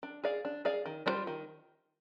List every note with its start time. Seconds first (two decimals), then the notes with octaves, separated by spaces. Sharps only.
0.03 D4
0.24 G#4 D5 F5
0.45 D4
0.65 G#4 D5 F5
0.86 D#3
1.06 G3 D4 F4 C5
1.27 D#3